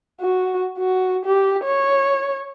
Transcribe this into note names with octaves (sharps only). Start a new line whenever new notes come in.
F#4
F#4
G4
C#5